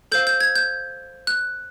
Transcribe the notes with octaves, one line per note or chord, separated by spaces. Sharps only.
A4 C5 F5 G6
G6
G#6
G6
F#6